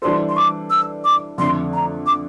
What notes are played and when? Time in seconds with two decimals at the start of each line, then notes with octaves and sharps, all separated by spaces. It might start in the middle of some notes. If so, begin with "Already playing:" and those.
0.02 E3 G3 D4 A4 C5 C6
0.29 C6
0.37 D6
0.70 E6
1.04 D6
1.38 F2 D3 A3 C6
1.73 A#5
2.06 D6